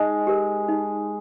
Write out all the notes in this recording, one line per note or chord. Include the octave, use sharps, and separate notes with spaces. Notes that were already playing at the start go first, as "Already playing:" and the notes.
Already playing: G#3 D#4
G4 A#4
D#4